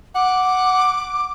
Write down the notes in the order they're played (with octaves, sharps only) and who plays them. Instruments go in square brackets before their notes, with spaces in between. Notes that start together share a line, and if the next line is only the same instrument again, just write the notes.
[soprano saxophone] F#5 [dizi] D6